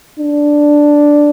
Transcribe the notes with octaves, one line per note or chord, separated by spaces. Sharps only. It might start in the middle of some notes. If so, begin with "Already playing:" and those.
D4